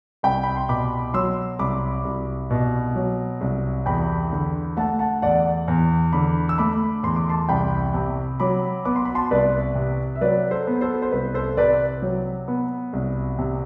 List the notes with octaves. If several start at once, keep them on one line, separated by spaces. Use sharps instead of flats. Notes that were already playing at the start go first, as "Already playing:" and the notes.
C2 G5 B5
B5
C6
B2 B5 D6
F#3 C6 E6
C2 B5 D6
C2
B2
F#3
C2
E2 G5 B5
D3
A3 F#5 A5
F#5 A5
E2 D5 F#5
E2
D3 B5 D6
E6
A3 B5 D6
E2 C6
D6
A5 C6
C2 G5 B5
C3
F#3 B5 D6
B3 D6
C6
B5
A5 C6
C2 B4 D5
C3
E5
F#3 B4 D5
A4 C5
B3
A4 C5
C5
C2 B4
A4 C5
C3 B4 D5
F#3
B3
C2
C3